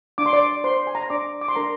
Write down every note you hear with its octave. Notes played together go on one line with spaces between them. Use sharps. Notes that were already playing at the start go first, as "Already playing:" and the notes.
D4 D6
C6
D5 D6
C5 C6
G#5
A#5
C6
D4 D5 D6
D6
C6
D4 A#4 A#5